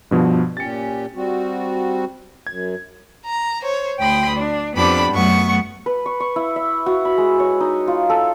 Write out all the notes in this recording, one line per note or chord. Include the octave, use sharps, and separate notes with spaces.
G2 B2 F3
A#2 C#4 G4 A6 C#7
G3 C4 F#4
F#2 G#6
A#5
C5 C#5
D2 G5 B5 C6 D#6
D4
F2 B3 D4 G4 B5
F#2 A3 B3 F#5 C#6
B4
C#6
C#6
E4
E5
F#4
B5
G#3
C#5
D#4
F4
A4